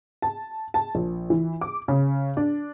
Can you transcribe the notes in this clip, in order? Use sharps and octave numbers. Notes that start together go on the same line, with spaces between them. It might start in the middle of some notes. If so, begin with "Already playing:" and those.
A5
A5
A#1
E3
D6
C#3
D4